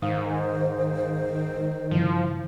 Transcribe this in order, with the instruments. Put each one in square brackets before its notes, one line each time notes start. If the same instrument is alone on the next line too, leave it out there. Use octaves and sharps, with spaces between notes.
[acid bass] G#2 [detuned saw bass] D#3 [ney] C5 [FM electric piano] F5 D#6
[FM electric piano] G2 C#3 E3 [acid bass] F3